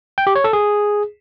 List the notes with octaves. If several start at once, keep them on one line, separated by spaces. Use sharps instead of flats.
G5
G4
C#5
A4
G#4